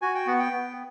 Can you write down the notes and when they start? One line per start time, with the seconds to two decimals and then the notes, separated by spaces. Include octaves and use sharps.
0.02 F#4 G#5
0.15 G5
0.26 B3 F#5
0.39 G5
0.52 B3